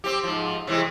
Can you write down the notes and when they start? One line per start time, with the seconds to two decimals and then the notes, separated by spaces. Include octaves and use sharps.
0.04 C4 G4
0.23 G#2 F3
0.67 C3 E3 G#3